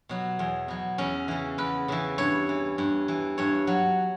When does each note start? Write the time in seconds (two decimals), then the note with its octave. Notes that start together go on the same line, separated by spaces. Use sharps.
0.09 B2 F#3
0.39 E2
0.68 B2 F#3
0.98 E2 C#4
1.28 C#3 E3
1.58 E2 B4
1.88 C#3 E3
2.18 G2 C#5
2.49 E3
2.78 G2
3.08 E3
3.38 G2 C#5
3.67 F#3